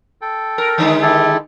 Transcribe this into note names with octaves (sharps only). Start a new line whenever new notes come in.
A4 G5
A#4
D3 D#3 G#3
E4 G4 A4